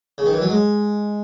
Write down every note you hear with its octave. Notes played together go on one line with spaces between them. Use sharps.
C#3
D#3
E3
F#3
G#3